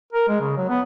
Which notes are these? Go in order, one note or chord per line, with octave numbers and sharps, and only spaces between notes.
A#4
G#3
C#3
F#3
B3